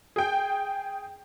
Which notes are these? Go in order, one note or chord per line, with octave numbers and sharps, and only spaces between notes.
G#4 G5